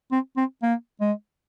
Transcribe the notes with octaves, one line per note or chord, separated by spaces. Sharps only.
C4
C4
A#3
G#3